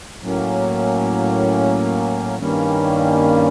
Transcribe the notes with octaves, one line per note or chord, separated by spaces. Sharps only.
A2 F#3 A#3 C#4
G2 D#3 G3 A#3 C#4